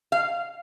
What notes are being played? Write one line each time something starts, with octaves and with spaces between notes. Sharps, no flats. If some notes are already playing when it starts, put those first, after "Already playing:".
F5